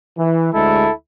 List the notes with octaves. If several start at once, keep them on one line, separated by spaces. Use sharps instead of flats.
E3
D2 G#3 E4 A4